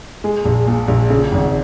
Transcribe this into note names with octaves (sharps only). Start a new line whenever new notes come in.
G#3
A#1
A#2
A#1
C#3
G#1